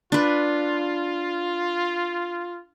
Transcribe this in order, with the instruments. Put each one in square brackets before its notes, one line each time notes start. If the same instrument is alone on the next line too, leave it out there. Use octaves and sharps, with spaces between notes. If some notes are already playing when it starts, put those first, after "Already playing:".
[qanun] D4 B4 [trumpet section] F4